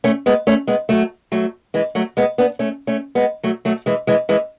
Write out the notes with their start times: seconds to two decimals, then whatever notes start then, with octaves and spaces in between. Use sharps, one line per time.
0.04 A3 C#4
0.26 G#3 B3
0.47 A3 C#4
0.67 G#3 B3
0.89 F#3 A3
1.32 F#3 A3
1.74 E3 G#3
1.95 F#3 A3
2.17 G#3 B3
2.38 B3 D4
2.59 A3 C#4
2.87 A3 C#4
3.15 G#3 B3
3.43 F#3 A3
3.65 F#3 A3
3.86 E3 G#3
4.07 E3 G#3
4.29 E3 G#3